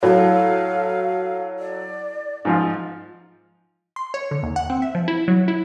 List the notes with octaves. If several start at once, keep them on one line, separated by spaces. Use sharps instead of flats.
A2 F#3 A4 F5
D5
G#2 F3 F4
C6
C#5
D3
D#2
F#5
C4
E5
F3
E4
F#3
E4